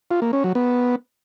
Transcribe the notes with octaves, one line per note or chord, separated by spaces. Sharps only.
F4
A#3
C#4
F#3
B3